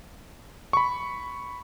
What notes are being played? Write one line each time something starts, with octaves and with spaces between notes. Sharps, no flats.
B5 C#6